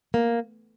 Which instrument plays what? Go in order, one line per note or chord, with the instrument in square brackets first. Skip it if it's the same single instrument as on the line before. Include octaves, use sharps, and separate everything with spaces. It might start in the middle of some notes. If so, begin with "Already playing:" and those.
[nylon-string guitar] A#3